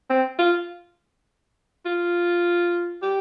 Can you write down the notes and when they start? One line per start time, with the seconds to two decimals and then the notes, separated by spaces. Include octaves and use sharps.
0.10 C4
0.39 F4
1.86 F4
3.03 G4